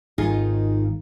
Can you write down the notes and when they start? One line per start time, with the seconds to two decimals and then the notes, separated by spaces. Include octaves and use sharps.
0.18 G#1 D#3 D#4 F4 G#4